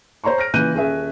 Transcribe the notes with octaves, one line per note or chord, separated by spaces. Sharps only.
C5 C#5 A#5 C6 C#6
F6 A#6 D7
A#2 C#3 E3 F#6 G6 D#7
D#1 C#4 G#4 E5